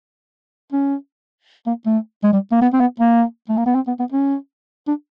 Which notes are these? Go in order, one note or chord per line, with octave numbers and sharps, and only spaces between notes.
C#4
A#3
A3
G#3
G3
A#3
B3
C4
B3
A#3
A3
A#3
B3
C4
B3
B3
C#4
D4